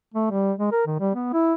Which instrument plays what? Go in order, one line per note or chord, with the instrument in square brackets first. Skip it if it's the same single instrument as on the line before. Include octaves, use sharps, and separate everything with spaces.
[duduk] A3
G3
G#3
A#4
D#3
G3
B3
E4